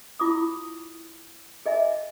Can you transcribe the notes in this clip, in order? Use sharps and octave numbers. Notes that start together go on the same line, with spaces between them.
E4 F4 D6 D#6
G#4 D#5 E5 G#5